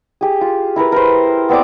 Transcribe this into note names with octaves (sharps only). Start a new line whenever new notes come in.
G4 G#4
F4
E4 A#4 B4
A#4 C5
B3 C4 D5 D6